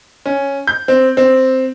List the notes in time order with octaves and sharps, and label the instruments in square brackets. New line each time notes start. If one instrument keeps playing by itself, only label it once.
[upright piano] C#4
G6
C4
C4